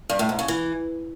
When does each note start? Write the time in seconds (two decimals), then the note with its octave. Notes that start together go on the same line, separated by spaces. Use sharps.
0.09 G2
0.19 A2
0.29 G#2
0.39 C#3
0.48 E3